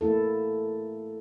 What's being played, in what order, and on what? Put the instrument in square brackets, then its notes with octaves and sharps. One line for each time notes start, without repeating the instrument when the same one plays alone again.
[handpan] A3 A#3 E4 A4